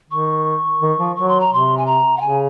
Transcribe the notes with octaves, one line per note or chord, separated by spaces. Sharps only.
D#3 C#6
D#3
F3
F#3 C#6
C6
A#5
C3 C6
G#5
A#5
F#5
C#3 G#5